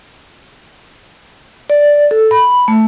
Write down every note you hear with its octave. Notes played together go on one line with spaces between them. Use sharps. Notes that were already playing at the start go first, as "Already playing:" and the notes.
D5
A4
B5
A3